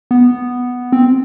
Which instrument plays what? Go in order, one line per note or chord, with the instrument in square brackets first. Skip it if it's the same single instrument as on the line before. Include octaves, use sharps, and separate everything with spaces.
[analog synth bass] B3
C4